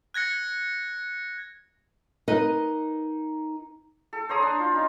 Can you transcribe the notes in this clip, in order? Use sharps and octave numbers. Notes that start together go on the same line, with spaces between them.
F#6 G#6 A#6 C#7
D#4 A#4 B4 D#5
A4
C5 C#5 A#5 D#6
D4
F4
C#4 D#4